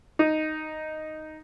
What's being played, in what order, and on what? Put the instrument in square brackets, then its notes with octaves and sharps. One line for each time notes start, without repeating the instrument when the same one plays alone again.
[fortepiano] D#4